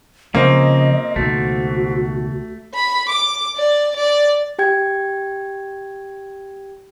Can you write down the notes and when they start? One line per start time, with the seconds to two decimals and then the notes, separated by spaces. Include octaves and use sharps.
0.35 C#3 F3 A#3 C4 D#5
1.16 C#2 B2 D#3 A3 F#4
2.74 B5
3.09 D6
3.56 D5
3.97 D5
4.59 G4 G5 G#6